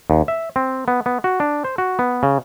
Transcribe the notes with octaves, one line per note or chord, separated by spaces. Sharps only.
D#2
E5
C4
B3
B3
F#4
D4
C5
F#4
B3
C#3